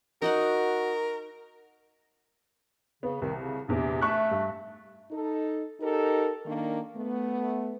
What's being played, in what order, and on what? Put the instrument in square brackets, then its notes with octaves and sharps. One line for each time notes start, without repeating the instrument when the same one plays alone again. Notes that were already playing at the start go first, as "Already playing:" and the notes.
[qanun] D#4 D#5 F#5 [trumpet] F#4 [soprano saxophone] A#4
[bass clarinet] C#3 [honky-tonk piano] B3
[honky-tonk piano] C2 [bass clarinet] D#3
[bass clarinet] C#3
[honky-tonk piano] A#1 E2 [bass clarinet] C3
[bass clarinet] A3 [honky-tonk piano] E5 C#6 F#6
[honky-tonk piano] G2
[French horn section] D#4 A4
D#4 G4 A4 A#4
D#3 A#3 D4
A3 B3